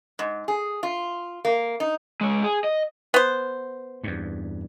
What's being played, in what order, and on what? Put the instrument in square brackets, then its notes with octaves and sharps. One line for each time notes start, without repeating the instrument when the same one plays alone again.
[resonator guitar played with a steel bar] G#2
G#4
F4
A#3
D#4
[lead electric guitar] G#3 C#5
G#4
D#5
[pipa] B3 C5
[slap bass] E2 G2